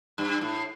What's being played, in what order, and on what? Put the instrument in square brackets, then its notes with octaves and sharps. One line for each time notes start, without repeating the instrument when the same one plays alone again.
[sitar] G2
A2